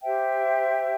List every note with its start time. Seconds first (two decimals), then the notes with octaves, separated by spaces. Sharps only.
0.03 G4 C5 E5 G5